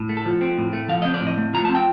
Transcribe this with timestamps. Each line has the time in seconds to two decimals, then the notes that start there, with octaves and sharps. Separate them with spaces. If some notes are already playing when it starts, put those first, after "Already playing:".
Already playing: A2
0.09 A3
0.17 A4
0.26 F3
0.41 C4
0.58 A2
0.73 A3
0.89 F3 F5
1.02 C4 D#5
1.14 D5
1.21 A2
1.27 D#5
1.38 A3
1.53 F3 A#5
1.65 A5
1.70 C4
1.75 G5